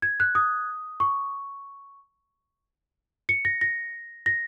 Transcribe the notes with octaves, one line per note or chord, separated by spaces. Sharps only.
G#6
F#6
D#6
C#6
C#7
A#6
A#6
A#6